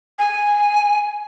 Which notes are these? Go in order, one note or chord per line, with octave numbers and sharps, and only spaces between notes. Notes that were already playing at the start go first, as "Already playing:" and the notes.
G#5